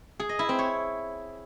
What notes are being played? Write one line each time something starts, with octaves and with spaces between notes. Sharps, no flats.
G#4
D#5
E4
C4
C#5